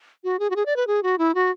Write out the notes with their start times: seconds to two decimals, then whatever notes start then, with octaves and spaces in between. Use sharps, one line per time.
0.24 F#4
0.39 G#4
0.50 F#4
0.56 G#4
0.66 D5
0.76 B4
0.87 G#4
1.03 F#4
1.18 E4
1.35 F#4